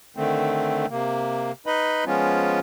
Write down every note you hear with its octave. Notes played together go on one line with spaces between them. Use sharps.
D3 D#3 A3 C4
C3 A#3
D#4 B4 D#5 B5
F3 G#3 B3 C#4 F4